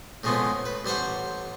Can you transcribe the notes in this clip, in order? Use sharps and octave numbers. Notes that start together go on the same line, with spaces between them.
A2 C#3 F3 G#3 A3 B3
B4
A1 G3 C5 F#5 C#6